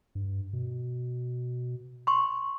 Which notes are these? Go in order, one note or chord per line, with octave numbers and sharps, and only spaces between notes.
G2
B2
C6 C#6